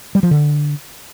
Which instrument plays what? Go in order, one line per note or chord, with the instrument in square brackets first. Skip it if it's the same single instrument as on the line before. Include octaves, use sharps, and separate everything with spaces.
[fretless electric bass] G3
F3
D3